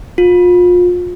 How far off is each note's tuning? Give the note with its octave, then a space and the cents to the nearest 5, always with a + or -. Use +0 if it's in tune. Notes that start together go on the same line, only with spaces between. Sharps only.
F4 +30